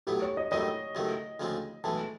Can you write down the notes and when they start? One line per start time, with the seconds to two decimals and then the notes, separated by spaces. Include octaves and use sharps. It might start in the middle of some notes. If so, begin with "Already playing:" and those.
0.07 B1 A2 F#3 B3 G4
0.22 C#5
0.37 D#5
0.51 G2 D#3 F#3 A3 C4 D#5
0.95 C#2 C3 D#3 F#3 A3
1.40 D2 C#3 F3 G#3 C4
1.84 B1 A2 E3 G#3 A5